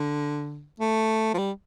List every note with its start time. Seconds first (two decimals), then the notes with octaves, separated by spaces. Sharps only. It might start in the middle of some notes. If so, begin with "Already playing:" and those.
Already playing: D3
0.80 A3
1.34 F3
1.38 G3